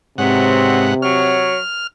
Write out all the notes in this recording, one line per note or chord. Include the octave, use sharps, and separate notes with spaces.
G#2 C3 F#3 B3 C4 F#5
F#3 C#5 F6